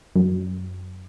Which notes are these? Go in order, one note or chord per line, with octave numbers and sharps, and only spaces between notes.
F#2